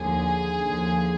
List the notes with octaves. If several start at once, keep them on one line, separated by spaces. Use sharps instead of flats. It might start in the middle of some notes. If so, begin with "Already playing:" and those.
Already playing: D#2 D3 F3 G#4
D#2 D3 F3